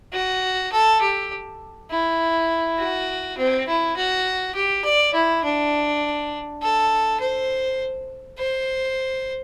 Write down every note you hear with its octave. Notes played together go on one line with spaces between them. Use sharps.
F#4
A4
G4
E4
F#4
C4
E4
F#4
G4
D5
E4
D4
A4
C5
C5